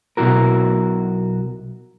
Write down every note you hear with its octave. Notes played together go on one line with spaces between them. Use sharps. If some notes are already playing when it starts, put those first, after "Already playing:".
B1 B2 D#3 E4 F#4 A#4